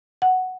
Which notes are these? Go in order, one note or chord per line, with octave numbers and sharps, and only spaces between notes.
F#5